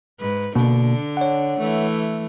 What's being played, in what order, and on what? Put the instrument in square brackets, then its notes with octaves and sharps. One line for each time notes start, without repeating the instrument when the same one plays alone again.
[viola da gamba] G#2 B4
[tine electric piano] B2 A#3 [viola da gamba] D3 D4
[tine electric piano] C#5 F#5
[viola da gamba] E3 A3